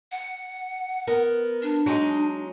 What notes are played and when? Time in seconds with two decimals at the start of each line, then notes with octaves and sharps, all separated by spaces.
0.11 F#5
1.07 B3 A#4
1.62 D4
1.86 F#3 G#3 D#4